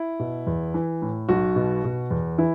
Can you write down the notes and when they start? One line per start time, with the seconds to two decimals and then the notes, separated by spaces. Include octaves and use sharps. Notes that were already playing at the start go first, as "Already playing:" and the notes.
Already playing: E4
0.19 B2
0.47 E2
0.74 E3
1.02 A2
1.29 B1 F#4
1.56 B2
1.84 B2
2.11 E2
2.38 E3 E4